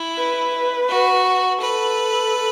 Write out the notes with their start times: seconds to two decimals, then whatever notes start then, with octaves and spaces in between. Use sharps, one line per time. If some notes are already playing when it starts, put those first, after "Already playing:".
Already playing: E4
0.18 B4
0.88 F#4
1.60 A4 B4